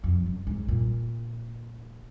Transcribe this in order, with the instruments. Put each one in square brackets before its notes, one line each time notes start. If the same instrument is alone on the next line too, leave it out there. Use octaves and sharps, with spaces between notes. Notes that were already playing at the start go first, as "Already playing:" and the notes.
[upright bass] F2
F#2
G#2
A#2